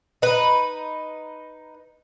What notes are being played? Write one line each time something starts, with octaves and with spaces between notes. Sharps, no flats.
D#4 B4